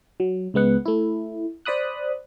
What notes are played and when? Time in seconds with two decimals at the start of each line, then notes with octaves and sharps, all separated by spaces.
0.20 F#3
0.54 C#2 G#3 B3 F#5
0.85 A3 E4
1.65 C5 D5 B5 D#6 F#6